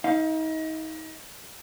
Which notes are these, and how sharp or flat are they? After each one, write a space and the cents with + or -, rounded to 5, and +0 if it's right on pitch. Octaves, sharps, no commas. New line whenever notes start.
D#4 +35 F5 -15